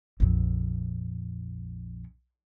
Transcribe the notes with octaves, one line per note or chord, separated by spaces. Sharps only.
A#1 F2